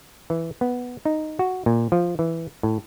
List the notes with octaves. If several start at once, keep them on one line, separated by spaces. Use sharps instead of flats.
E3
B3
D#4
F#4
A#2
F3
E3
A2